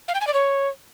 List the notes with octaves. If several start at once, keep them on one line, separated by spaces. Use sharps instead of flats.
F5
G5
G#5
D5
C#5